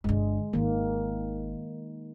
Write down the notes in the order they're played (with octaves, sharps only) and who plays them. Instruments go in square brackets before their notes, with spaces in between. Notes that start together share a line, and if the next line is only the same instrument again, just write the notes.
[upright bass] G1 D3 [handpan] G#3
[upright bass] G#1 [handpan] D#3 A#3